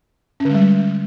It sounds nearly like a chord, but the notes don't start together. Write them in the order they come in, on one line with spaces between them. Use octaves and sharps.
C#4 D3 G#3 G3